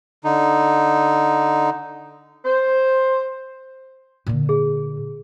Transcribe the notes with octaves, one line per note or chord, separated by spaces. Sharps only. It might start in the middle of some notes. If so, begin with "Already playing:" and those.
D3 D#4
C5
A#2 D3
G#4